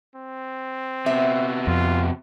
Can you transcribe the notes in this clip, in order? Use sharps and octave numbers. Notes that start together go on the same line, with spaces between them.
C4
C3 B3 E5
F2 F4